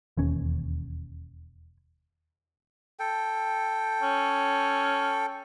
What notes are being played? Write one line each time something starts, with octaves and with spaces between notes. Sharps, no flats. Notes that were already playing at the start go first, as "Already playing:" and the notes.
E1 D#2 C#4
A4 G5
C#4